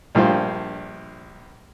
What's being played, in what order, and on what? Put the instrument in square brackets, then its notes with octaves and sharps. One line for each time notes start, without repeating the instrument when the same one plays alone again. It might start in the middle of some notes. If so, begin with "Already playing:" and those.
[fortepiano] A#1 G2 F4 C5